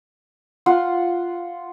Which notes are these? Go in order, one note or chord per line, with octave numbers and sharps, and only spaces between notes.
F4 F#5